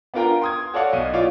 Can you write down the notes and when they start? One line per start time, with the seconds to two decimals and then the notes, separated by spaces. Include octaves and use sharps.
0.14 B3 D4 F4 A#4 G5 A#5
0.42 C6 D#6 G#6
0.73 F#4 A4 C#5 D5 F5 F#5
0.93 B1 D#7
1.13 E4 F4 C#5 D5